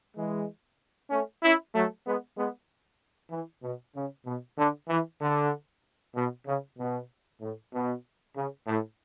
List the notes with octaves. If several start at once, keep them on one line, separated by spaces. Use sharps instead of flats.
E3 G#3
A3 C#4
C#4 E4
F#3 A3
G#3 B3
G#3 B3
E3
B2
C#3
B2
D3
E3
D3
B2
C#3
B2
A2
B2
C#3
A2